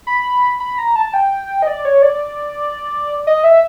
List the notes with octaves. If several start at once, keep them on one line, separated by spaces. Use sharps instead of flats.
B5
B5
A#5
A5
G5
D#5
D5
C#5
D5
D#5
E5